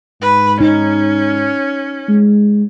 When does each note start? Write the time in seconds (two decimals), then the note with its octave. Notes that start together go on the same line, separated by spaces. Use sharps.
0.21 G#2 B4
0.61 C#4 D#4
2.09 G#3